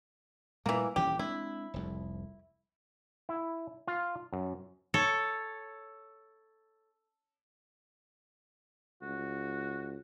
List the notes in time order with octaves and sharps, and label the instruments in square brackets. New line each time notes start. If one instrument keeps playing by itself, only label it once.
[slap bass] A#2 G3 A3 [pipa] E3 A#3
[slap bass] D#1 E3 C#4 [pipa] G4
[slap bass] G#3 C4 D4 [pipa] E4
[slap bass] F1 C2 F2
[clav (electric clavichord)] E4
F4
F#2
[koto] A4 C#5
[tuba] C#2 [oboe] F#4